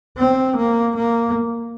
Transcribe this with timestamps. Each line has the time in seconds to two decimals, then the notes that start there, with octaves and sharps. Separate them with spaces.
0.18 C4
0.57 A#3
0.96 A#3